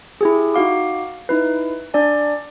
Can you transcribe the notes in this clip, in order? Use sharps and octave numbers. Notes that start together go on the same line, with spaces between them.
E4 G4 G#4
D#4 F#4 F5 D6
D#4 E4 B4
D4 D5 G#5